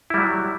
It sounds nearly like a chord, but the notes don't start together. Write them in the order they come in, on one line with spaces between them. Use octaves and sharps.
E4 G3 F#3